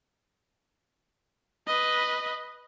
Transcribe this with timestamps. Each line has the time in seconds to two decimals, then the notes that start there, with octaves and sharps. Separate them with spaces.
1.67 B4 D#5